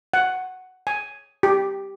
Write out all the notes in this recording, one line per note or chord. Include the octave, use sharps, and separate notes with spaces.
F#5
G#5
G4